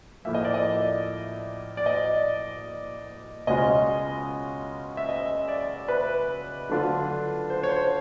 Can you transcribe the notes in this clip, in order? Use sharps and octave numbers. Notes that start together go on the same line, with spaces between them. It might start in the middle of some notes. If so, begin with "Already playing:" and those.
A2 F3 A#3 E5
D#5
D5
D#5
D5
D#5
C#2 B2 G#3 C#4 F4 D#5
E5
D#5
D5
B4
D3 F#3 A3 D4 F4
C5
C#5
C5